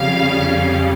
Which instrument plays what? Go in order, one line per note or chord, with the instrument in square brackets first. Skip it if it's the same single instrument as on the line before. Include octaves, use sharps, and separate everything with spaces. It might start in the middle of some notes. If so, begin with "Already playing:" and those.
Already playing: [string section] F2 C#3 G3 C#4 F5